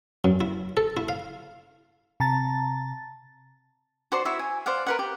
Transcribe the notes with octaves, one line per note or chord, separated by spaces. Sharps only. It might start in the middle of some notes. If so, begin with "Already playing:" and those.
F#2
E4
A4
E4
F5
C3 A5 A#5 A6
F#4 C5 D5 C6
E4 F#4 C#5 E5
G#5
C5 D5 F5 F#5
A#4 B4 F#5
G4